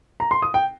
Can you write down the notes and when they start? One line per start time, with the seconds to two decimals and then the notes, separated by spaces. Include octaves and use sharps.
0.20 A#5
0.31 C6
0.42 D#6
0.54 G5